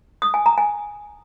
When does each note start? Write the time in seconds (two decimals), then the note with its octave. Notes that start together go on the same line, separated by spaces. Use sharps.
0.22 D#6
0.34 G#5
0.46 A#5
0.58 G#5